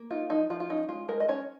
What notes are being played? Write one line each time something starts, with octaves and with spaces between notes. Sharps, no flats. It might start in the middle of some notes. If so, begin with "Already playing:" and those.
Already playing: A#3
D#4 F4
F3 D#4
F3 F4
F4
C#4 D#4
G#3 F4
G#3 A#4
D#5
C#4 C#5